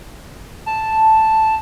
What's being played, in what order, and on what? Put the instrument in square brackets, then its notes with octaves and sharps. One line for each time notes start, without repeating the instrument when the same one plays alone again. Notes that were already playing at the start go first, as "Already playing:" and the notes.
[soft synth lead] A5